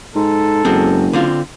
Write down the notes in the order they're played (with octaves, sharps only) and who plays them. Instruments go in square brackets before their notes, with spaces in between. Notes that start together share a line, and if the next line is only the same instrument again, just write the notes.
[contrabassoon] G#2 [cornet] A4
[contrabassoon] F#1 [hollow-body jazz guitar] F#2 G#3 C4
[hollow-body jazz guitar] D3 C4 F4